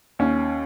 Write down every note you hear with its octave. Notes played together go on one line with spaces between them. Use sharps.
D#2 C#4